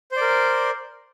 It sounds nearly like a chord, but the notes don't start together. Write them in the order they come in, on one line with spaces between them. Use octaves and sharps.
C5 D5 A#4